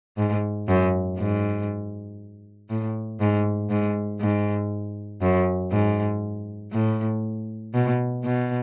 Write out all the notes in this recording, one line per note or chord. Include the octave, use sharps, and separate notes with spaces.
G#2
F#2
G#2
A2
G#2
G#2
G#2
F#2
G#2
A2
B2
B2